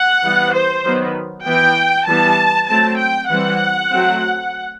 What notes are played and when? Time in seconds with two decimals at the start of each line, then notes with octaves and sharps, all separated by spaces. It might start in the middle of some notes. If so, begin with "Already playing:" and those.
Already playing: F#5
0.23 E3 G3 B3
0.55 C5
0.85 D#3 F#3 B3
1.46 E3 B3 G5
2.08 E3 G3 B3 A5
2.69 F#3 A3 C4 A5
2.99 G5
3.30 E3 G3 C4 F#5
3.92 F#3 A3 C4